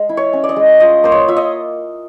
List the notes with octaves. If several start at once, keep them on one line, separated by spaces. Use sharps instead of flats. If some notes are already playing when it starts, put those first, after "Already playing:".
Already playing: G#3
E4
C#5
C#4
D5
D#5
G#3
F4 D#5
A#3 C5
C#5
F4 E5
D#5